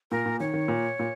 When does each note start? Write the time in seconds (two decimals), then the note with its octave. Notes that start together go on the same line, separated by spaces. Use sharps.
0.11 A#2 A#4
0.26 A#2
0.40 D#3 C#5
0.54 D#3
0.68 A#2
0.99 A#2